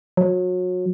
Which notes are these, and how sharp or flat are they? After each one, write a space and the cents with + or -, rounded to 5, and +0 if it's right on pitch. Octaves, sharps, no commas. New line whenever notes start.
F#3 -30